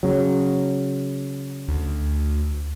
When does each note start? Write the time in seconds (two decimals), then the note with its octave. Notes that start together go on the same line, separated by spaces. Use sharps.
0.03 C#3 F#3
1.68 D2